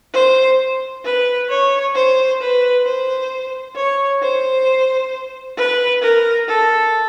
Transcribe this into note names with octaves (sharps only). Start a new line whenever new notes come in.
C5
B4
C#5
C5
B4
C5
C#5
C5
B4
A#4
A4